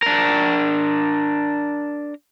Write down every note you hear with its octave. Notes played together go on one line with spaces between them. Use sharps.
D4 A#4